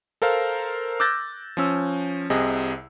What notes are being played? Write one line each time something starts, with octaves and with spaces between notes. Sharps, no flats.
A4 A#4 C5 F5
D6 E6 F#6 G6 A6 A#6
F3 C#4 E6
C2 C3 G#4 D#5